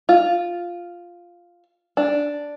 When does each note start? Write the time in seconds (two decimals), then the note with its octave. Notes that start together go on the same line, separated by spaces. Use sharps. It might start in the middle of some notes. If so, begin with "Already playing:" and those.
0.09 F4
1.97 D4